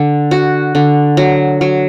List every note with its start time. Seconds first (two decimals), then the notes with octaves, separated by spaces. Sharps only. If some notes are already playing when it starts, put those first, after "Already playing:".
Already playing: D3
0.31 F#4
0.75 D3
1.17 F#3
1.61 F#3